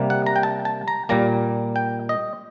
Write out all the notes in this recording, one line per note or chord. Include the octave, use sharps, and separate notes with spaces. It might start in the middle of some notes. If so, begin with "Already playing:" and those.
Already playing: C3 G3 A#3
F#5
A#5
G5
A5
A5
A#5
A#2 G3 A#3 A#5
G5
D#5